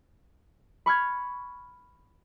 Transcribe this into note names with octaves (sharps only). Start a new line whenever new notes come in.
B5 C#6 F6 G#6